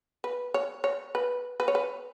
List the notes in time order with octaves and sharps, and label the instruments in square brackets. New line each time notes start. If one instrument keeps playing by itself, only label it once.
[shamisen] B4
C#5
C#5
B4
B4
C#5
B4